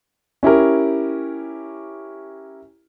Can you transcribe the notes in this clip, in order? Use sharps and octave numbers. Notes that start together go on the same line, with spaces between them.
C#4 E4 G4 A#4